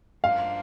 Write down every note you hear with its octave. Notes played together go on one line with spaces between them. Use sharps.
G2 F3 A#3 D4 F5